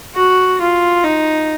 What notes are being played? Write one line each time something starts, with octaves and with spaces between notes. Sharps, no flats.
F#4
F4
D#4